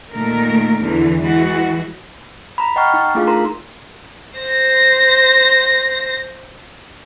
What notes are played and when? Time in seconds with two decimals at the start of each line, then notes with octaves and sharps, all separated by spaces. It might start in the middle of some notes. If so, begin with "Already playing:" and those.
0.12 A#2 D#3 A3 A#4
0.80 E2 D3 E3
1.21 E3 G#3 F#4
2.58 A#5 B5
2.76 D#5 F#5 G5 A#5 C#6 F6
2.94 D#4
3.15 A3 D4 D#4 F4 G#4 F5
3.27 A#4 A#5 C6
4.39 C5 A#6